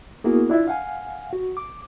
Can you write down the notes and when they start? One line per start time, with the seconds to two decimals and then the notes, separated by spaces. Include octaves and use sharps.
0.24 A#3 B3 E4 F#4 G#4 A#4
0.50 D4 E4 F4 E5
0.68 F5 F#5 G#5
1.33 F#4
1.57 D6